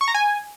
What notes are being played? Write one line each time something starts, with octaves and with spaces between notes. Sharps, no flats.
C#6
A#5
G#5